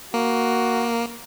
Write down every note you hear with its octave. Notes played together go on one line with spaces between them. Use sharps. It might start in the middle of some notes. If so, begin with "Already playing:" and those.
A#3 F#4